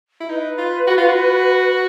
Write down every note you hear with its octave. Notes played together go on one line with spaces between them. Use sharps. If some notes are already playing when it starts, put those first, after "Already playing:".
E4
D#4 B4
F4
F#4
F4
F#4